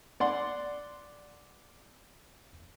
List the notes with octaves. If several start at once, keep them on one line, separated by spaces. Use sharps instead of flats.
D5 F#5 C6